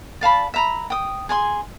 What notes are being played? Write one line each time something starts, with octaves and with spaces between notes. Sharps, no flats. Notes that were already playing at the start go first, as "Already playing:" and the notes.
D5 F5 A5 B5
E5 A#5 B5
G5 D#6
G#4 G#5 C6